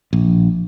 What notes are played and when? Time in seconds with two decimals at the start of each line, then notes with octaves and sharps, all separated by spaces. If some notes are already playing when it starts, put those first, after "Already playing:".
0.13 A#1